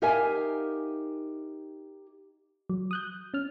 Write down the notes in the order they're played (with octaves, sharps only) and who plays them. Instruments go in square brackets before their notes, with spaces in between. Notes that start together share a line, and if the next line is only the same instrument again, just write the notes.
[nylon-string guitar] D#4 G4 A#4 E5 F5 G#5
[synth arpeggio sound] F#3
D#6 F#6 G6
C#4 F6